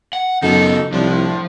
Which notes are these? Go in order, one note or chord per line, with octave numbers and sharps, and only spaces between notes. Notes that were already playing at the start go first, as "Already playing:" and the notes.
F#5
F#2 C#3 B3 D#4 A4
C2 A2 F3 D4